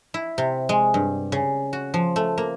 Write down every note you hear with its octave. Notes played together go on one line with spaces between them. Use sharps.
E4
C3
G#3
G2
C#3
F#4
F3
A3
A#3